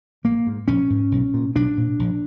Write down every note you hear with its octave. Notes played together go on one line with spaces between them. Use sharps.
A#1 A#3
G#2
A#1 C#4
G#2
B1
A#2
B1 D4
A#2
A#1